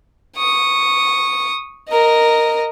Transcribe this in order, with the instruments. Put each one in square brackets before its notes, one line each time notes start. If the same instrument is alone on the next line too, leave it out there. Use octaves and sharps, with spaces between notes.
[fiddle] C#6 D#6
A#4 D#5